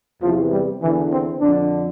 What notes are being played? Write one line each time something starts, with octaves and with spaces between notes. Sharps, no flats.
E2 C3 E3 F3
G3
E2 D3 E3
C4
F2 D3 D4